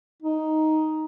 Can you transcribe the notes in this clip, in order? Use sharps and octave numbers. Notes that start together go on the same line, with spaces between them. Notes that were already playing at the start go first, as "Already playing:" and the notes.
D#4